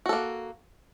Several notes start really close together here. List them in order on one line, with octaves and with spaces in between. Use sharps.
F#4 A4 A#3